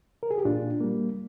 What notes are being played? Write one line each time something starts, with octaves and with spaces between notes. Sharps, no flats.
A#4
G#4
G4
A#2 D4 F4
G3 A#3